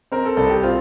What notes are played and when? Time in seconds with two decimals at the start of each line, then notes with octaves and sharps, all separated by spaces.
0.12 C4 A#4
0.25 A4
0.37 C2 A4
0.50 G4
0.63 C4 F4